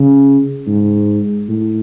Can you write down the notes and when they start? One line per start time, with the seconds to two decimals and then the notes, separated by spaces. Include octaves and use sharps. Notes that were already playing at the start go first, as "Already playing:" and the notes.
Already playing: C#3
0.67 G#2
1.49 A2